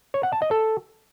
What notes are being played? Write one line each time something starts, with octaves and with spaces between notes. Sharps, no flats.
C#5
F#5
A5
D#5
A4